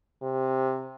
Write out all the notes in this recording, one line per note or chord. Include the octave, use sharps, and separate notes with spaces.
C3